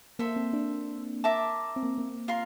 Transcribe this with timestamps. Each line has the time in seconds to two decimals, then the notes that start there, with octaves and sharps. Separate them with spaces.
0.19 A#3 A4 C5 E5
0.36 C4
0.53 D4
1.24 A#4 E5 A5 D6
1.76 C4
1.83 A#3
1.98 A#3
2.28 F4 A#4 F5 C6